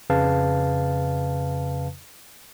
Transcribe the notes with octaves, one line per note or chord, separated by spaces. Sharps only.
F2 C#3 B4 F5 A5